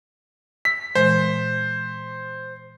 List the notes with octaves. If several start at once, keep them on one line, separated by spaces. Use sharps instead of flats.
E6 B6
A#2 E3 G#3 C5